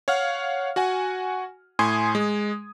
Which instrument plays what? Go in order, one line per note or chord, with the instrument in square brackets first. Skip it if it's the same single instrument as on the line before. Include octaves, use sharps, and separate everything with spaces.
[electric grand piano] C#5 F5 F#5 F6
F#4 F#5 G#5
A2 G#5 C6 D#6 G#6
G#3